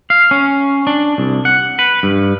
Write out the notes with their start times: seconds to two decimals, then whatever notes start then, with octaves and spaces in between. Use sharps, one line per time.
0.10 F5
0.31 C#4
0.87 D4
1.18 C2
1.45 F#5
1.79 B4
2.03 G2